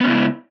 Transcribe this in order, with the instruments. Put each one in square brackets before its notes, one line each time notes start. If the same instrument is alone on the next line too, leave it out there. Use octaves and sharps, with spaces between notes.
[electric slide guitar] B3
C#4
C#3
E4
G#3